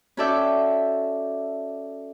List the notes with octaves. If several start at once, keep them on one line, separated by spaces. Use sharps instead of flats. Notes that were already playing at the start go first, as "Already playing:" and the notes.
C#4 F#4 A4 D5 E5 G5